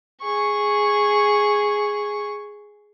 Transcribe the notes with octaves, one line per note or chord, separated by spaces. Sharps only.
G#4 C#6